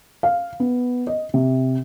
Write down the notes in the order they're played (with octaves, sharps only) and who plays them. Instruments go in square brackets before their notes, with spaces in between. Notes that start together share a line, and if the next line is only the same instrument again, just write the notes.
[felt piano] F5
B3
D#5
C3